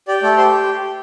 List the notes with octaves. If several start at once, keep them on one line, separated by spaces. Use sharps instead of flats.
G4 D5
A3 D5
G4 C5